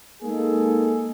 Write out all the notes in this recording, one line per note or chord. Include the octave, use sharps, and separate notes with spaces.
G#3 A#3 D#4 G#4 A4